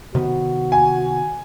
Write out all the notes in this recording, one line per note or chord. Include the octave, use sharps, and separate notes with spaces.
C3 D#3 B3 F#4
G#5